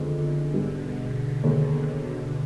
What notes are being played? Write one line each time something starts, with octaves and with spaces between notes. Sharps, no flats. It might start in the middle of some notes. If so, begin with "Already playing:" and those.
Already playing: F2 D3 D#3 G#3 B3
G#2 B2 G3 B3 D4
D#2 D3 G#3